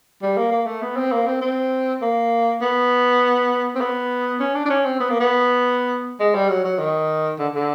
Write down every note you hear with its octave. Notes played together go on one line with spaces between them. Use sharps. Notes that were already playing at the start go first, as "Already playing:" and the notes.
G3
A#3
A#3
A3
B3
C4
A#3
C4
C4
A#3
B3
C4
B3
C#4
D4
D4
C#4
C4
B3
A#3
B3
G#3
G3
F#3
F#3
D#3
D3
D3